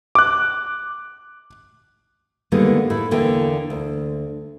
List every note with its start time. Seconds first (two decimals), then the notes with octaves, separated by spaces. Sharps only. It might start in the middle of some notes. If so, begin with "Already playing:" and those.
0.15 D6 F#6
2.52 D3 D#3 G3 G#3 A#3 B3
2.90 A2 E4
3.11 E2 D3 A#3 E4 G5
3.70 D2